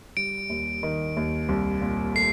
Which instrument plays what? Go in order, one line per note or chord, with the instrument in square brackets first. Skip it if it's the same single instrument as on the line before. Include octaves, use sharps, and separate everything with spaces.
[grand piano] G3 [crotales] D7
[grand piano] D#2
D#3
D#2
C2
A#2
[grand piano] A3 [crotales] C7